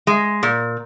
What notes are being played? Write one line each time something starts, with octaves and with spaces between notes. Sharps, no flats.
G#3
A#2